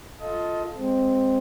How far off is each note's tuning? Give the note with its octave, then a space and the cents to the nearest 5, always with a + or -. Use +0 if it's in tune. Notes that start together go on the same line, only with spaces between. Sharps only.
F4 +0 A4 -5 D#5 +20
G#3 -15 C4 +0